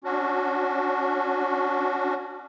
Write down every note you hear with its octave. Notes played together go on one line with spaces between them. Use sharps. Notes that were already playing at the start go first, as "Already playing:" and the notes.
C#4 D4 F#4